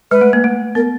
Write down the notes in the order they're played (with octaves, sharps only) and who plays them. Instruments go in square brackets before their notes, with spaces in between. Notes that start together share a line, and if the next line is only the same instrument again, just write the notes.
[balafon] G#3 [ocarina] B4
[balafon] A3
A#3
A3
[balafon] B3 [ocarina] A#4